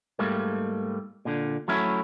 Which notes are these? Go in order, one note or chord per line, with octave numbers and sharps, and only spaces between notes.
G#2 G3 A3 A#3
A#2 D3
F#3 A3 C#4 E4